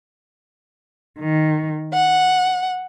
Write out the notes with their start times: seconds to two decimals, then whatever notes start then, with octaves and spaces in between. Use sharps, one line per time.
1.20 D#3
1.92 F#5